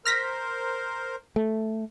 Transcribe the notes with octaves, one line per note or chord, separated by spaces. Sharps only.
A#4 C5 F6 A#6 B6
A3